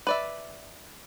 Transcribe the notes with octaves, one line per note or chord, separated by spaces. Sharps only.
B4 D5 E5